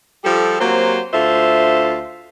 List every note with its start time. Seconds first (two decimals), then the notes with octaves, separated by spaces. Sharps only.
0.25 F3 G3 G4 A4
0.61 F#3 A#3 C4 F#4 G4 C5
1.13 D2 F4 A4 C5 E5